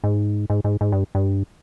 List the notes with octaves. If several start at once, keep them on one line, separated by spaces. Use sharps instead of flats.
G#2
G#2
G#2
G#2
G2
G2